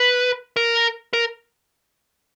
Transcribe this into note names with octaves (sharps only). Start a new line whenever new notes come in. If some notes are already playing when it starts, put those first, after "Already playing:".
Already playing: B4
A#4
A#4